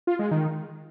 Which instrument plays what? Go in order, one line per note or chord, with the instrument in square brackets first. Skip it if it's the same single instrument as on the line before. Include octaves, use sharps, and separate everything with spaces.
[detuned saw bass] F4
G#3
D#3